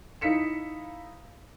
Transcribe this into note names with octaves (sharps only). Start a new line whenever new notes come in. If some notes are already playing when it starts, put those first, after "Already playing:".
D#4 E4 F5 B6 C#7 E7